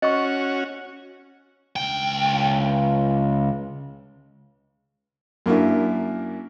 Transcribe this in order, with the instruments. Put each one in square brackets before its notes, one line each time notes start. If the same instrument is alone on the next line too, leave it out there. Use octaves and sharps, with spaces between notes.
[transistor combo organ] C#4 F#4 [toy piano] D#5 C#6
[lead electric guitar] C#2 G5
[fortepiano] F#2 A#3 D4 E4